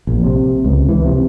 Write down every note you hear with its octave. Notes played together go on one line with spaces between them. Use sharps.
A#1
C3
C#2
E3
C3